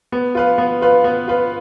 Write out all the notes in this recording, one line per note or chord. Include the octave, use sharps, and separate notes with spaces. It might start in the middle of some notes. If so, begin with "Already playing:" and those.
B3
F4 B4 F5
B3
F4 B4 F5
B3
F4 B4 F5